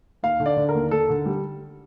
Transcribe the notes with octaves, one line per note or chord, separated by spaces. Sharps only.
D#2 F5
D3
D5
D3
A#4
D#2
D#2 A4
D3
G3